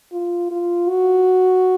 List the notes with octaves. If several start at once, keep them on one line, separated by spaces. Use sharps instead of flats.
F4
F4
F#4